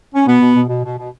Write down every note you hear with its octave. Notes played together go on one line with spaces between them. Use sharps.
C#4
B2 B3
B2
B2
B2
B2
B2